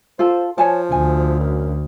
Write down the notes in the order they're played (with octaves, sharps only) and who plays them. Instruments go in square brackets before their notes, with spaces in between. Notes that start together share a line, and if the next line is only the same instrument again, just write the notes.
[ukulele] F4 A4 [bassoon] C5
[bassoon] F3 [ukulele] C#5 G#5 A5
[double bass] D2 [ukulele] G#5
[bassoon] F#2